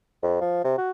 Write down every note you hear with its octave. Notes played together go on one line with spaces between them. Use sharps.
F2
F3
C3
F#4